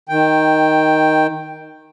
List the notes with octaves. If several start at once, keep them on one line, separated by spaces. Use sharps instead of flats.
D#3 G5